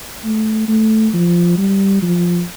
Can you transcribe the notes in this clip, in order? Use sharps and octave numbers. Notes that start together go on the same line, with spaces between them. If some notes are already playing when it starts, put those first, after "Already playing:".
A3
A3
F3
G3
F3